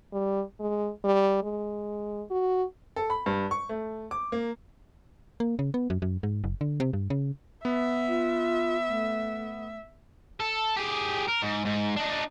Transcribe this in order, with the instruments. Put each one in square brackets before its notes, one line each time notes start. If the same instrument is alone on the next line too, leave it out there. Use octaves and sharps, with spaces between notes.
[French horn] G3
G#3
G3
G#3
F#4
[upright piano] A4
B5
G2
C#6
A3
D6
A#3
[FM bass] A#3
C#3
B3
F#2
F#2
G#2
F#1
D3
C3
G2
C#3
[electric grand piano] B3 [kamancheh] E5
[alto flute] F4
A3
[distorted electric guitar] A4
G4 G#4
A#4
G#2
G#2
D4 D#4